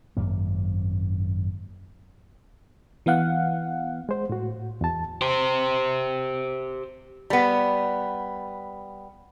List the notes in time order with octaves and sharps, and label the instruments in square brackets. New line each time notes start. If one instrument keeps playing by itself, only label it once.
[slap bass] G#1 F#2 A#3
[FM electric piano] E3 B3 F5 F#5
[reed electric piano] G#3 C5
A2 F#4
E2 A5
[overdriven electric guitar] G4 C5
[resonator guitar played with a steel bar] G3 B3